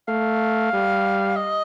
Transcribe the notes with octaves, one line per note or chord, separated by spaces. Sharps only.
A3 F5
G3
D#5